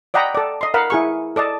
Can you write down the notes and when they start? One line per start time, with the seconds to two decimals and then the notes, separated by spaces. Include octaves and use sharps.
0.14 D5 D#5 F#5 G5 A#5 B5
0.35 A4 D5
0.61 D#5 C6
0.74 A#4 F5 F#5 B5
0.90 E4 G#4 C#6
1.36 A4 D5 D#5 A5